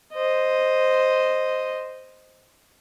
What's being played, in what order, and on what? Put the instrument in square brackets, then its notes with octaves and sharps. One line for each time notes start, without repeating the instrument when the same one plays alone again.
[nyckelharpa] C5 D#5